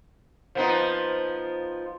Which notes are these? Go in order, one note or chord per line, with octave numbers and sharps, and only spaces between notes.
F3 B3 D#4